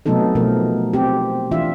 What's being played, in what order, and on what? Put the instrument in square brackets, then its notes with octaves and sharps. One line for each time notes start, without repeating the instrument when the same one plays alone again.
[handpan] C3 F#3 A3 B3 D#4 A4
B2 F3 A3 A#4
C4 G4
E3 D4 F4 E5